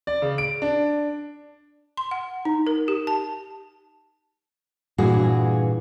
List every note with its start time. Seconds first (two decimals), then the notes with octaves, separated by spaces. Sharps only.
0.07 D5
0.22 C#3
0.38 D7
0.62 D4
1.97 C6
2.11 F#5
2.45 D#4
2.67 A#4
2.88 G4
3.07 A5
4.98 G2 A#2 E3 F#4 G#4